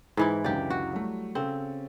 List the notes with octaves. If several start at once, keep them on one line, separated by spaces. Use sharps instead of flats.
G#2 E3 E4
C#2 F#2 D3 G4 D5
F#4
F#3 G3 A3
C#3 C4 C#4 A4